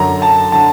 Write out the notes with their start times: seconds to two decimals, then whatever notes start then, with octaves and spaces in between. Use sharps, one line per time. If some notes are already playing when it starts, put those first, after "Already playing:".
Already playing: F#2 D3 F#3 A#5
0.22 A5
0.52 D3 F#3 A5